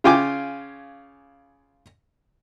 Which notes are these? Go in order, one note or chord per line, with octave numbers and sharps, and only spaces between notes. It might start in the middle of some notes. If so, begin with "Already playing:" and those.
C#3 F4 G5 G#5 D6